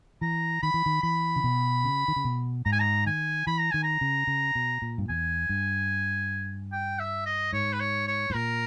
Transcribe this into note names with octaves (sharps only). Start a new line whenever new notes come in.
E3 A#5
D#3 B5
E3
D#3
E3 B5
C#3
B2
C#3
D#3
C#3
B2
G#2 A#5
G#5
A#5
D#3 G#5
E3 B5
A#5
D#3 G#5
A#5
C#3
C#3
B2
A#2
G2
E2 G#5
G2
G5
E5
D#5
G#2 C#5
B4
C#5
C#5
G#2
A#2 A#4